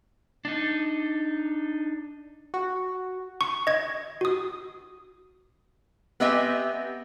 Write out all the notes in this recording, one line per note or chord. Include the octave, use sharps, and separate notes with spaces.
D4 D#4
F#4
C#6
D#5 G#6
F#4 D#6
B3 C4 G4 D#5 E5 G#5